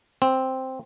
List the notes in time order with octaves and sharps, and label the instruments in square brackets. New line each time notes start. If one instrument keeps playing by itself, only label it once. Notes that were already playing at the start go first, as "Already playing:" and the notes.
[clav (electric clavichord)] C4